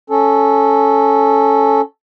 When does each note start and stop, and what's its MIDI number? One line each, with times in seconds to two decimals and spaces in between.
0.10 1.81 61
0.10 1.81 69